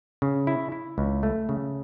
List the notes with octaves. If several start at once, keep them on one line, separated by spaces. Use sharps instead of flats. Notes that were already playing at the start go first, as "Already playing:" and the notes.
C#3
E4
E4
C#2
A3
C#3